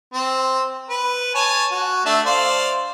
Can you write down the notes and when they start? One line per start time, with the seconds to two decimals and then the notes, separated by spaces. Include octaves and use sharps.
0.13 C4
0.90 B4
1.35 C#5 G#5 A5
1.72 F#4
2.06 A3 D4 E5
2.26 C5 D5 F5